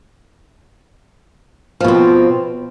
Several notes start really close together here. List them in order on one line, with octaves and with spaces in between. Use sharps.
F3 B2 C4